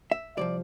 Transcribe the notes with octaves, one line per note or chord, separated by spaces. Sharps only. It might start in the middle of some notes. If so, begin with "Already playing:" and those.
E5
C2 C3 F3 D5